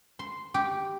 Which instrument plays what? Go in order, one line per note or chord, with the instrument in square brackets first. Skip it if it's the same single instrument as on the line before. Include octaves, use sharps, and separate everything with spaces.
[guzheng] C6
G4